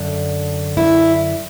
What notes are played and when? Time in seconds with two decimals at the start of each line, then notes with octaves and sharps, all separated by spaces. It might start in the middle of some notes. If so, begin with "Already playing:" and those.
Already playing: F#2 D3 D4
0.77 E4